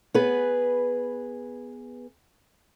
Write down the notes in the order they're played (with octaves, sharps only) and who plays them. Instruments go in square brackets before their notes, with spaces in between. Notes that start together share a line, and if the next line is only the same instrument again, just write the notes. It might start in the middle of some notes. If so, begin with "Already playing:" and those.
[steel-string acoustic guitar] B3 G#4 B4